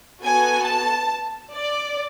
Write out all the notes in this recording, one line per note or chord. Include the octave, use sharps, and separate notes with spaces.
B3 F#4 A4 G#5
A5
D5